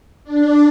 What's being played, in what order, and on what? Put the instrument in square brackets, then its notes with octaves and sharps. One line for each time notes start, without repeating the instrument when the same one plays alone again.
[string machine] D4